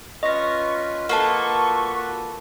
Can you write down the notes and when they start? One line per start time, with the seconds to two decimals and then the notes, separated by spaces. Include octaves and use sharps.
0.23 C#4 F4 B4 D#5 C#6 A#6
1.09 A#3 F4 F#4 A4 B4 C#6